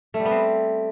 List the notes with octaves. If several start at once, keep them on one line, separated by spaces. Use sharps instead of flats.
A3
G3
B3
C4